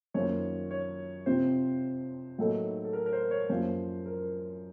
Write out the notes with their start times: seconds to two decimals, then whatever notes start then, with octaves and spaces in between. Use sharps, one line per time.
0.14 F#2 D#3 A#3 F4 C5 C#5
0.71 C#5
1.26 F2 C3 F3 C4 F4 C5
2.38 A2 F#3 A#3 D#4 A4
2.85 A4
2.93 A#4
3.06 A#4
3.13 C5
3.31 C#5
3.50 F#2 F3 A#3 F4 C5
4.06 A#4